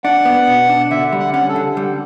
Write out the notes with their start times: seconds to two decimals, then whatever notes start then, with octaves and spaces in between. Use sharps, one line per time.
0.04 D4 F#5
0.25 B3
0.47 B2
0.69 D4
0.91 D3 E5
1.12 G3
1.20 F#5
1.34 C#4 F#5
1.49 A4
1.56 D3
1.77 G3